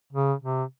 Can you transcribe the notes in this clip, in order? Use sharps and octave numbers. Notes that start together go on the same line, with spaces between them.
C#3
C3